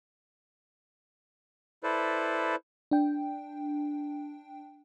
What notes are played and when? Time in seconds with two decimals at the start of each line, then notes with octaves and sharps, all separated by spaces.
1.83 E4 A4 B4 C5 D5
2.91 D4 G5